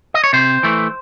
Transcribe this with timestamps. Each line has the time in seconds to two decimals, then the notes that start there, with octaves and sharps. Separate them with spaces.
0.14 D#5
0.24 C#5
0.33 C3 C5
0.63 E3 A3